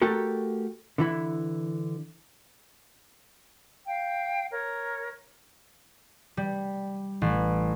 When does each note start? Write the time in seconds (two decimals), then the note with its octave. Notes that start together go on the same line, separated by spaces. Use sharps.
0.02 A3 F#4 G4 A4 A#4
0.98 D3 E3 E4
3.86 F5 G5
4.51 A#4 C#5
6.37 G3
7.22 A1